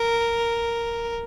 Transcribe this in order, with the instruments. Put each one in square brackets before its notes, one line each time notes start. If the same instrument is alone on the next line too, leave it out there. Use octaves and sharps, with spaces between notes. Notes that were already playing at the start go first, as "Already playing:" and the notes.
Already playing: [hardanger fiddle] A#4